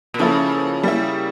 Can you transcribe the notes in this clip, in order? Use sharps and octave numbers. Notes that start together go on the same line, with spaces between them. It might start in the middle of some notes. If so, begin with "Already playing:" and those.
A#2
C#3 F3 A#3 E4 A4
G3 A#3 E4